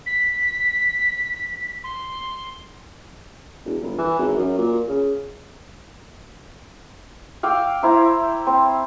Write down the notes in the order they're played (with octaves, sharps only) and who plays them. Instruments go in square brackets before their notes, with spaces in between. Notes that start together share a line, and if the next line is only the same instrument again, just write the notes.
[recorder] B6
C6
[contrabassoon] E1
G1
E3
G#1
F#2
A#2
C#3
[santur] F5 G5 D6 E6
E4 C5 A#5
C4